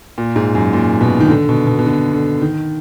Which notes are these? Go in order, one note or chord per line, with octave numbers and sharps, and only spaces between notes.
A#2
G#2
F#2
A#2
B2
D#3
D3
B2
B2
B2
D3
D3
D#3